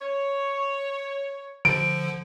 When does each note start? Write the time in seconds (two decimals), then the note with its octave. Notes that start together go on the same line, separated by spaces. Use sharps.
0.02 C#5
1.65 D3 F3 D7